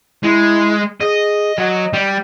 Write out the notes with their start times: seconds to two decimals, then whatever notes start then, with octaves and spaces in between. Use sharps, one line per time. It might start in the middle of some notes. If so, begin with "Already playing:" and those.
0.23 G#3 E4
1.01 G#4 D#5
1.58 F#3 D#5
1.93 G3